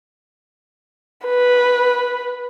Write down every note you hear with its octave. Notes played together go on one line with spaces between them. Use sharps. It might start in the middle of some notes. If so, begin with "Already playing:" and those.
B4